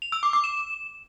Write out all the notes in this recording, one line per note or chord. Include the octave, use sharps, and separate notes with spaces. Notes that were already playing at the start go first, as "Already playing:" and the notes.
F7
E6
D6
D6
E7